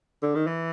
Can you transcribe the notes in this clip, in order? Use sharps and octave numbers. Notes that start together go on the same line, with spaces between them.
D3
D#3
E3